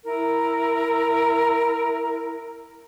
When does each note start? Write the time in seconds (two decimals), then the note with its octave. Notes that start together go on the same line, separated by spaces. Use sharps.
0.04 E4 A#4